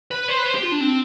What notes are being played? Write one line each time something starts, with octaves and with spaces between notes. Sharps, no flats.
B4
C5
B4
C5
G4
F4
D4
C4